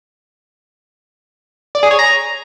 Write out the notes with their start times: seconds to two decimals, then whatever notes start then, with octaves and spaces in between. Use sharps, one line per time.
1.75 D5
1.83 G#4
1.91 C#5
1.99 A#5